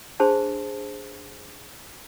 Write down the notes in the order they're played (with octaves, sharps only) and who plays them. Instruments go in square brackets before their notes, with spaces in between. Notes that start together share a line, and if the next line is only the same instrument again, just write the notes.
[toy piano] D4 G#4 C5 A5 C6